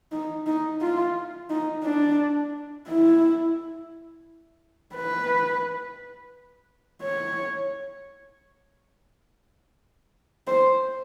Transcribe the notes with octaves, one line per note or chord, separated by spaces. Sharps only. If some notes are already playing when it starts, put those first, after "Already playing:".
D#4
D#4
F4
D#4
D4
E4
B4
C#5
C5